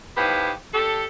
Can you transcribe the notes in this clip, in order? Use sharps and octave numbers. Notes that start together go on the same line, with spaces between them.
A2 F3 B3 D#4 G4
D4 G4 A4